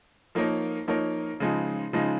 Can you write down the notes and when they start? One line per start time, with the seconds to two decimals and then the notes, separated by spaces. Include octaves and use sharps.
0.35 F3 A#3 D#4 A#4 C#5
0.88 F3 A#3 D#4 A#4 C#5
1.40 C#3 F3 G#3 D#4
1.93 C#3 F3 G#3 D#4